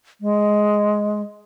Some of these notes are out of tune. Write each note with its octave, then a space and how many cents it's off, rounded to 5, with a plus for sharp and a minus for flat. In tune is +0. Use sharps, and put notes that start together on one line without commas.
G#3 +5